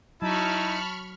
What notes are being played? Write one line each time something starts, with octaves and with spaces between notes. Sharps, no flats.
F#3 D#4 E4 A5 B5 C#6 F6